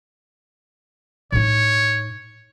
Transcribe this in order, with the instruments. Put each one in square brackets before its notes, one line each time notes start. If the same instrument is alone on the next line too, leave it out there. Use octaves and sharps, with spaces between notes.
[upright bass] A2 D#4 [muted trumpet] C#5